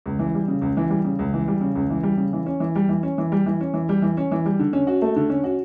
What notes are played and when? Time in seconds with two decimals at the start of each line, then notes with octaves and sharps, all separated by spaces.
0.06 C#2
0.19 E3
0.34 G3
0.48 C#3
0.62 C#2
0.77 E3
0.90 G3
1.05 C#3
1.19 C#2
1.33 E3
1.48 G3
1.61 C#3
1.75 C#2
1.90 E3
2.03 G3
2.18 C#3
2.33 E3
2.46 C#4
2.60 E3
2.75 G3
2.89 E3
3.03 C#4
3.18 E3
3.32 G3
3.46 E3
3.61 C#4
3.74 E3
3.89 G3
4.02 E3
4.17 C#4
4.31 E3
4.46 G3
4.59 D3
4.73 C#4
4.87 F#4
5.02 A3
5.16 D3
5.30 C#4
5.44 F#4